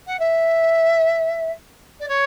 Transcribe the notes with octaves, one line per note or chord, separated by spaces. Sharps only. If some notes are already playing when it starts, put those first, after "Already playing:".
F#5
E5
D5
C#5